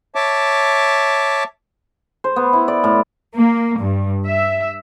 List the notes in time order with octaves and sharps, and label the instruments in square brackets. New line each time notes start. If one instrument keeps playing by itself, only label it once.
[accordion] C#5 E5 A5 D6
[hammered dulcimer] C5
B3
E4
D5
A2
[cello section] A#3
G2
E5